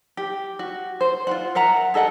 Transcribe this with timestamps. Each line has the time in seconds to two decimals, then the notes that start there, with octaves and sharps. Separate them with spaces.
0.17 G4
0.59 F#4
1.01 C5
1.27 F4 F#4 F#5
1.55 A#4 E5 F#5 A#5
1.94 G#4 A4 D#5 F#5